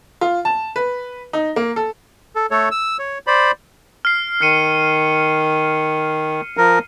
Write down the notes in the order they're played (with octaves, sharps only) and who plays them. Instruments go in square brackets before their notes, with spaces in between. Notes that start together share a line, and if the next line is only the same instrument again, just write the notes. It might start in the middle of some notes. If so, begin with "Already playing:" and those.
[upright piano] F4
A5
B4
D#4
A#3
A4
[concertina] A4
A3 A4 C#5
E6
C#5
C5 D5 B5
[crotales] F6 C7
[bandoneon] D#3 [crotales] F6 C#7 D#7
[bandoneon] F3 A#4